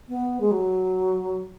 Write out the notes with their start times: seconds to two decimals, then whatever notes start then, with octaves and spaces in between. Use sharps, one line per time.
0.09 B3
0.41 G#3
0.51 F#3